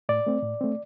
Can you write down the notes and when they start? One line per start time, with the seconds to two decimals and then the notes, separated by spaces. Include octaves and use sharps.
0.09 A2 D5
0.27 A3 C4
0.43 A2
0.61 A3 C4